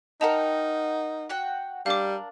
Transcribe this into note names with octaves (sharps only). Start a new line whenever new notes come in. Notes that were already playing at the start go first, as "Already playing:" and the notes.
D#4 A#4 D#5 F#5 G5 A5 A#5
F#4 F#5 G5
G3 D4 A#4 F5 D6